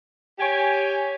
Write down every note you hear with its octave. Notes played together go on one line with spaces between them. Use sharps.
G4 C#5 G5 G#5